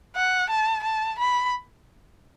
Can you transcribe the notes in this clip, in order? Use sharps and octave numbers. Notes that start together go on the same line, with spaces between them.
F#5
A5
A5
B5